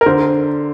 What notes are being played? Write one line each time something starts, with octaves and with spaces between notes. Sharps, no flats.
A#4
D3 C5